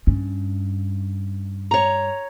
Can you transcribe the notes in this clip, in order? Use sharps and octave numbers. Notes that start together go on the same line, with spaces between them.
G2 C#4
C#5 A#5